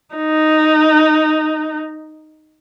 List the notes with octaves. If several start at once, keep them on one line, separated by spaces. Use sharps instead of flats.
D#4